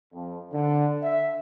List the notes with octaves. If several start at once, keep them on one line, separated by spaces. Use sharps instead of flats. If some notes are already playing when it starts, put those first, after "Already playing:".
F2
D3
E5